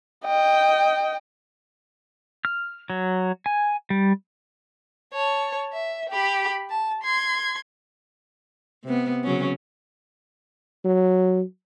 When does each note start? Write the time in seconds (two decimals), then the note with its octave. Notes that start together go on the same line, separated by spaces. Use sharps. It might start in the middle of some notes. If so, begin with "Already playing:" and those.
0.25 D#5 G5
2.45 F6
2.90 F#3
3.46 G#5
3.90 G3
5.13 C#5 A5
5.73 E5
6.10 G4 B5
6.70 A5
7.03 C6 G#6
8.84 C3 B3
9.24 C#3 F#3 C#4
10.85 F#3